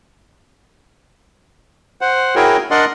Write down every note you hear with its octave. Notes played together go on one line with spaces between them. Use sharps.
C5 F#5
E4 F#4 G#4 A#4 C#5 G5
D4 A#4 D5 D#5 F#5 C6